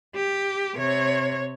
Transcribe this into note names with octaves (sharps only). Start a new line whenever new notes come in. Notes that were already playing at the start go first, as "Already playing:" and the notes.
G4
C3 C#5